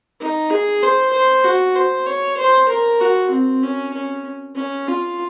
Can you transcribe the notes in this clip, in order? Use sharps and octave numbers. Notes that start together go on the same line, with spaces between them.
D#4
G#4
C5
C5
F#4
C5
C#5
C5
A#4
F#4
C4
C#4
C#4
C#4
F4